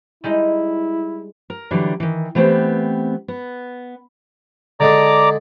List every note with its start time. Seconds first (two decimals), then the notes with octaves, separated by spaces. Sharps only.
0.24 G3 G#3 D#4 E4
1.50 A#4
1.71 D3 E3 F#3 G3
2.00 D#3 E3
2.35 E3 A3 B3 C4 G4
3.28 B3
4.80 D3 G#3 D4 D5 A#5 D6